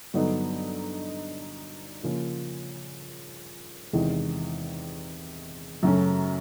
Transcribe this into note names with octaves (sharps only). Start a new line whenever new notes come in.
G2 D3 F#3 B3 D#4
C#3 F3 A#3 C#4 F4
E2 C3 D#3 G#3
F#2 C#3 F#3 A3 C#4